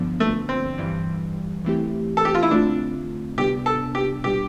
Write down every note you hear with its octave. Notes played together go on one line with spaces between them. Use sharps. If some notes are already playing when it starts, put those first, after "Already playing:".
Already playing: G2 D3 F3 B3 D4
A3
C4
G2 E3 G3
E3 A3 C4 E4 G4
A4
G4
F4
E4
D3 A3 C4 D4 F4
C3 G3 B3 D4 G4
A4
G4
B2 G3 D4 G4